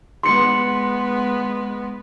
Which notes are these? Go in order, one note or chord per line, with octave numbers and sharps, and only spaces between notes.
G#3 B3 C6 C#7